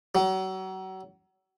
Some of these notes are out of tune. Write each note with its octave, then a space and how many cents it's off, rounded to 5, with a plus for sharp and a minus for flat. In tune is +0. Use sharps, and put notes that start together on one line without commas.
F#3 +35